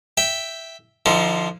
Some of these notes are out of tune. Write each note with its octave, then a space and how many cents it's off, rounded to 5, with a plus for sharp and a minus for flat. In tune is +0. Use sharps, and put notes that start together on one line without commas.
E5 +0 G5 +0
D3 +30 F3 -5 D#4 +40